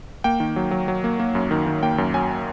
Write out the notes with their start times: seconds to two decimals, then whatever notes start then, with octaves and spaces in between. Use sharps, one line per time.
0.24 A#3 G5
0.40 D#3
0.56 F#3
0.71 F#3
0.88 F#3
1.04 A#3
1.19 A#3
1.35 F#2
1.51 D#3
1.67 D#3
1.82 A#3 G5
1.98 F#2
2.14 F#3 G#5